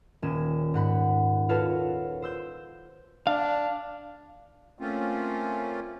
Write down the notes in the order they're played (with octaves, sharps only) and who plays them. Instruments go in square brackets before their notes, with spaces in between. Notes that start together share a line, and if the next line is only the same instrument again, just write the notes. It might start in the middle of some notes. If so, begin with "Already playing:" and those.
[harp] D#1 C#4 E7
G#2 F#5 B5
F4 F#4 A4 B4 C#5 F5
C5 E6 G6
[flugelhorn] D4 [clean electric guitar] F5
[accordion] A3 A#3 C4 C#4 F4